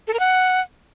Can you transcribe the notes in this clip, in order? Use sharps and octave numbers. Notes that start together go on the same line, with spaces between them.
A4
A#4
F#5